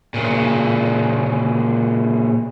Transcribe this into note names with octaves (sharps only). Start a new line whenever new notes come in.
A#2 C#3